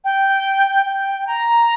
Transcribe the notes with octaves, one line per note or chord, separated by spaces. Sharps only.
G5
G5
A#5